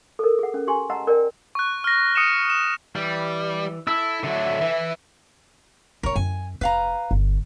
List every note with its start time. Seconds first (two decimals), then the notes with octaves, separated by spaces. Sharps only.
0.19 A4 A#4
0.39 G#4 F#5
0.54 C#4
0.68 G4 G5 G#5 C6
0.90 D#5 F#5 A5 A#5 C6 E6
1.07 A#4 D5 G5
1.55 C#6 F#6
1.84 F6 A#6
2.15 D#6 C#7 D#7 E7
2.50 E7
2.96 E3 G3
3.87 E4 A4 E6
4.24 D3 F#3 E5
4.61 E3
6.03 F1 G2 A#4 C#5
6.16 F#2 E4 G#5
6.61 F1 B4 F5 A#5
7.11 G1